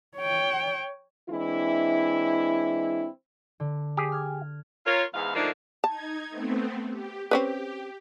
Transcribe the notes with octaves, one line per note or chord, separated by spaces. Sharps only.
C#5 G5
E3 G#3 C4 D4 E4
D3
G4 G#4
F6 G#6
F4 A#4 C#5
E2 G#2 F5
D3 F3 A3 A#3 D4 D#4
D#4 A5 G#6
A3 B3 C4
G4
C4 C#4 G4 B4